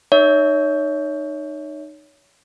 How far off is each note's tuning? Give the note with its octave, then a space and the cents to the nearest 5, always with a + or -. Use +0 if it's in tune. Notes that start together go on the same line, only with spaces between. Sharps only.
D#4 -25 C#5 +20 E5 -20